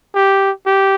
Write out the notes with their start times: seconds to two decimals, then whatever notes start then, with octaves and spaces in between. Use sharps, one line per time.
0.15 G4
0.67 G4